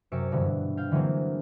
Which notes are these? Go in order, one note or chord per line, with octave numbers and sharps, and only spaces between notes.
F#2 C3 E6 C#7 D7
G2 B2 D3 E3 G3
F5 G5
D3 E3 F#3 G#3 A#3 C4